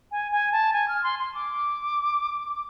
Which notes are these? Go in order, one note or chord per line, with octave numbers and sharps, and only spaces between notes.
G#5
G#5
A5
G#5
F6
C6
C6
D6